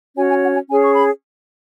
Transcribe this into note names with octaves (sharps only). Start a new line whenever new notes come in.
C#4 F#4 C#5 G#5
G#5
F#5
G#5
C#4 G#4 C#5 G#5
C#6
B5